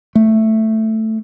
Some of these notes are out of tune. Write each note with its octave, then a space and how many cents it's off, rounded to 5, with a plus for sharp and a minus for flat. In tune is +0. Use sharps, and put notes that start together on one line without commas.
A3 +5